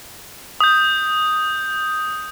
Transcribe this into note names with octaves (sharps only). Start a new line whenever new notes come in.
D#6 G6